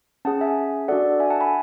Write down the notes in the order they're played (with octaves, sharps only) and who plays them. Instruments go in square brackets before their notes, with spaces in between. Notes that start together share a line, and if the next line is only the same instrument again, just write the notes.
[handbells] C#4 G#4 F#5 A5
E5 G#5
D4 F#4 A4 D5 F#5
E5 G#5
F#5 A5
G#5 B5